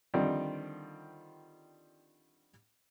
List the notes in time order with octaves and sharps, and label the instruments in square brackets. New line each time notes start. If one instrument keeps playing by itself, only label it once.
[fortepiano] D3 D#3 F3 G3 C4